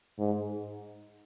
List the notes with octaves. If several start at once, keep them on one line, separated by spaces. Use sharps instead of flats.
G#2